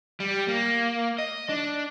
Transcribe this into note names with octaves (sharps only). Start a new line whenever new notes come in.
G3
A#3
D#5
D4